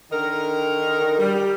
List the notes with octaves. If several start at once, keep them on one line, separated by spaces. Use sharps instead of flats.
D3 D#3 D#4 A#4
G3